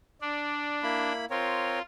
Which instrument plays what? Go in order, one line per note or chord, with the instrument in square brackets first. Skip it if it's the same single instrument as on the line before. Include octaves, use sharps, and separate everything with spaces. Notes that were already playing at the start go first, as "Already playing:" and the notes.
[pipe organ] D4 [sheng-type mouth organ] D5
[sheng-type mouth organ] A#3 E4 B5
[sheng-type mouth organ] C4 A#4 C#5 [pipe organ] F4